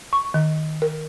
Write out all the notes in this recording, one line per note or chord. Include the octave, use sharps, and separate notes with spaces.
C#6
D#3
A#4